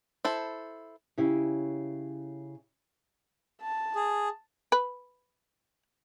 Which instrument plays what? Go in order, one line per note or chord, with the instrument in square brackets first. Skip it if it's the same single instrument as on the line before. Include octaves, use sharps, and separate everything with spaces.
[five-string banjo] E4 A4 C5
[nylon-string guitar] C#3 C#4 E4 G4
[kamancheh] A5
[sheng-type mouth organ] G#4
[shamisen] B4